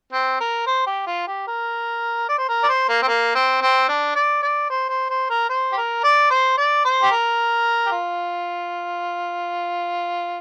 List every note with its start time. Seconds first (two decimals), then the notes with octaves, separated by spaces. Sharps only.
0.13 C4
0.40 A#4
0.67 C5
0.87 G4
1.07 F4
1.27 G4
1.47 A#4
2.29 D5
2.38 C5
2.49 A#4
2.63 D5
2.69 C5
2.89 A#3
3.02 C4
3.08 A#3
3.35 C4
3.62 C4
3.89 D4
4.15 D5
4.42 D5
4.70 C5
4.89 C5
5.10 C5
5.30 A#4
5.49 C5
5.72 G4
5.77 A#4
6.04 D5
6.30 C5
6.58 D5
6.85 C5
7.02 G4
7.11 A#4
7.86 G4
7.92 F4